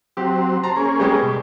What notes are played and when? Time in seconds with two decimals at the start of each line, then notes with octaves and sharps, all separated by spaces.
0.17 F#3 C4 G4
0.63 C5 A5 A#5
0.76 A#3 C#4 G#4
0.99 G3 G#3 B3
1.23 B2